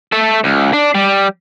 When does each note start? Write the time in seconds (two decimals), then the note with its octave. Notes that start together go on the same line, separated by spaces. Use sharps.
0.12 A3 A4
0.44 C#2
0.73 D4
0.95 G3